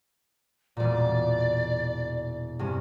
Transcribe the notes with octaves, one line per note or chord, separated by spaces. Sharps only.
E1 A#2 D5
G2 C3 C#4